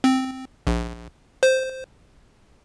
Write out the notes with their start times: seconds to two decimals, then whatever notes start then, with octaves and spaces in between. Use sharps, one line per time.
0.04 C4
0.67 A#1
1.43 C5